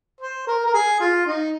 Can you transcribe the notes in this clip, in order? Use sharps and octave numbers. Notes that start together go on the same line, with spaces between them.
C5
A#4
A#4
G#4
F4
D#4